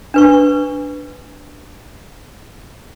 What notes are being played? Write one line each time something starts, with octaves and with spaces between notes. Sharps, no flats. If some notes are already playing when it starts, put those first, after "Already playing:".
D4 B4 C#6